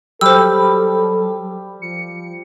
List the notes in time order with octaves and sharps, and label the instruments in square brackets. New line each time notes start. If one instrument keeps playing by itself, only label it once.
[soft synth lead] F#3 [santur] G3 [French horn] A4 [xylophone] C5 E6
[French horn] F3 [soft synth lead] C#7